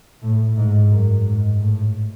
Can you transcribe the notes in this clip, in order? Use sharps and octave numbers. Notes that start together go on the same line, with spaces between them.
A2
G#2
F#2
G#2
A2